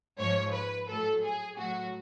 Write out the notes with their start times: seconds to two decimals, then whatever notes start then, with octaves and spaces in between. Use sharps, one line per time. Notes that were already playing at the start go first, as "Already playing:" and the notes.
0.18 G#2 F3 C#5
0.53 B4
0.89 A2 F#3 A4
1.24 G#4
1.58 A2 F#3 F#4